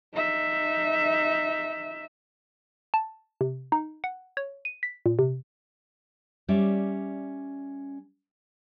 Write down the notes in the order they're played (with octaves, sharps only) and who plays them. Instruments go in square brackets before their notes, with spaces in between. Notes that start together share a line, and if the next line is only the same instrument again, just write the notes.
[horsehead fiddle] D#4 E5
[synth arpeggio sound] A5
C3
D#4
F#5
C#5
D#7
B6
A#2
C3
[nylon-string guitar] G3 C#4 D5 E5